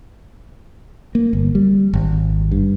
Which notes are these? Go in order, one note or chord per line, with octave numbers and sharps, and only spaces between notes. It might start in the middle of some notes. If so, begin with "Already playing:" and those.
A#3
G1
G3
G#1
G2